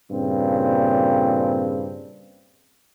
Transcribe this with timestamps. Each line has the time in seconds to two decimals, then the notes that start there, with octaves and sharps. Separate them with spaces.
0.11 G2 A#2 C#3 C4